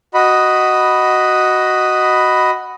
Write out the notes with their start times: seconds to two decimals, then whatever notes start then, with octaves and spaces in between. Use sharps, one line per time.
0.14 F#4 D#5 B5